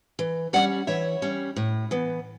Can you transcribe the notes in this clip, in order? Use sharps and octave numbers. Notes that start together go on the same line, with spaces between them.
E3
G3 C#4 D5 F#5
E3 C#5 E5
G3 C#4
A2
E3 B3